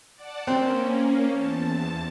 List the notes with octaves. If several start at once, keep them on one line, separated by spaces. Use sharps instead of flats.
D5 F#5 A5
A#3 C4 C#4
E2 A5